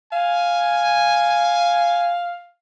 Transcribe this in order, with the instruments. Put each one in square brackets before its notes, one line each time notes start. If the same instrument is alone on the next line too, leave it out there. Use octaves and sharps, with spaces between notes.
[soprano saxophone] F5 [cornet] G#5